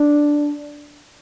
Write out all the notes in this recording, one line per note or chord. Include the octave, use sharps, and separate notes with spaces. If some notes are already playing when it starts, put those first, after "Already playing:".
Already playing: D4